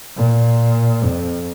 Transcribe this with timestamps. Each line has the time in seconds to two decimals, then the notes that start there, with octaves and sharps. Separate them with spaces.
0.17 A#2
1.04 F2